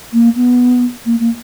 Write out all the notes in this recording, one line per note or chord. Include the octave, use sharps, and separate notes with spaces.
A#3
B3
A#3
A#3